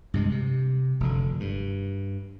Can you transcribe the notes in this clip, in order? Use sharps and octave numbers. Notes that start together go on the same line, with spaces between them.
G2 C3 G#3
C3
F1 F#2 D3
G2